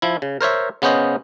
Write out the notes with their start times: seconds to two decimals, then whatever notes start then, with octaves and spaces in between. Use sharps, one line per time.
0.02 F3 E4
0.22 C#3
0.41 A#4 C5 C#5 E5
0.82 C#3 B3 C#4 C5 D#5